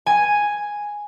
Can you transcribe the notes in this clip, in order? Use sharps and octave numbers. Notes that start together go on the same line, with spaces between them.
G#5